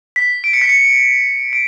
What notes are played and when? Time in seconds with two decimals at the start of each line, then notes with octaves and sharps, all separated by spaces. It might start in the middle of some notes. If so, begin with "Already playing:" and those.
0.16 B6
0.44 D7
0.53 C#7
0.61 B6
0.69 C#7
1.53 D7